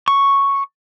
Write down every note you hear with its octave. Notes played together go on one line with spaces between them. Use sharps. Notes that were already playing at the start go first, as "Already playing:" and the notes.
C#6